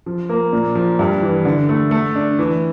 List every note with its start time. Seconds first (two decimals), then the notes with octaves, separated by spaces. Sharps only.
0.06 F3
0.29 A#3
0.53 A#2
0.75 F3
0.99 G2
1.22 E3
1.45 D3
1.69 A3
1.91 A3
2.15 D4
2.39 E3